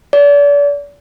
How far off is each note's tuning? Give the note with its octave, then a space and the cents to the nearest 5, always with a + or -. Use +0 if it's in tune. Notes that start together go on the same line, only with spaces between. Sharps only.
D5 -35